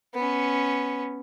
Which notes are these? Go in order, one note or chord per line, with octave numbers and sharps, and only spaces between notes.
B3 C#4